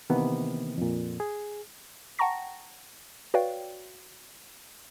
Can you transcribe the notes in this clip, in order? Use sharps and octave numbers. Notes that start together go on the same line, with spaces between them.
C3 D#3 E3 A#3 B3
F2 A#2
G#4
F#5 G5 A5 A#5 C#6 A#6
F#4 B4 C#5 D5 F5 G5